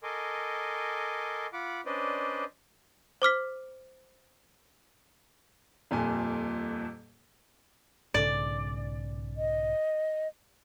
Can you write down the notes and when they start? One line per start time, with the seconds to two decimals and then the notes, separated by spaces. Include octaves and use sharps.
0.03 A4 A#4 D#5 G#5 C6 D6
1.53 F4 F#5 B5 D6
1.86 C#4 D4 B4 C5 D5 D#5
3.22 C5 D6 F6 B6
5.91 D#1 F2 A#2 G#5
8.14 B1 G#2 C#3 D5
9.37 D#5